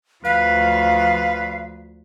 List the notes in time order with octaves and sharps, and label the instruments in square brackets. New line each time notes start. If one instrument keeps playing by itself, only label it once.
[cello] D2 F3 [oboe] B4 [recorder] F5